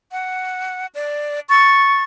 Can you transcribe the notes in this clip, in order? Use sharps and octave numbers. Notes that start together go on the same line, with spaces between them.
F#5
D5
C#6 A6